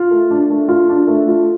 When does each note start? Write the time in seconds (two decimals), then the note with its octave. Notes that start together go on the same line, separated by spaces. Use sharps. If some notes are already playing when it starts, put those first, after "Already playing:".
Already playing: F4
0.11 A3
0.31 D4
0.50 A3
0.69 F4
0.89 D4
1.07 A3
1.28 F4